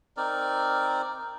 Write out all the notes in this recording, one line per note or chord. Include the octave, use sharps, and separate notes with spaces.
C4 D#4 A#4 D5